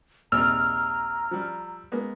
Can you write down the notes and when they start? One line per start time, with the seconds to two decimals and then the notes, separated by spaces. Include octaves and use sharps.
0.32 A#1 D#2 C3 A#5 E6 F6
1.31 F3 G3
1.92 G#3 A#3 B3